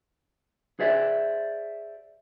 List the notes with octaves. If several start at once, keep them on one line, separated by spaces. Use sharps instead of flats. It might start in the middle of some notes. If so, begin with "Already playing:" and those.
G#4 C5 D5 E5